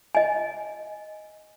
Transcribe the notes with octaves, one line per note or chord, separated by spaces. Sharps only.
D#5 G#5